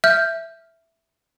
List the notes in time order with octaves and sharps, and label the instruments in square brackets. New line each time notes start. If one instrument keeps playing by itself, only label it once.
[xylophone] E5 F6 G6